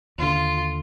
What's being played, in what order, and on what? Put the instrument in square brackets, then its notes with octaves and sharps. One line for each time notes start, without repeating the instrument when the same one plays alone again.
[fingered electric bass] D#2 D3 [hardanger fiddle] F4